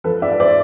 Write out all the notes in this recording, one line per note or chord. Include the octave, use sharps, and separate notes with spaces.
F3 A4 B4
G#2 D5 E5
C5 D5